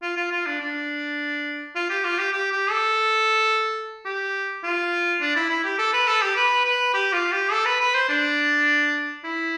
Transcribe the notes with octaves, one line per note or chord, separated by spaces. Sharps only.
F4
F4
F4
D4
D4
F4
G4
F4
G4
G4
G4
A4
G4
F4
D4
E4
E4
G4
A4
B4
A4
G4
B4
B4
G4
F4
G4
A4
B4
B4
C5
D4
E4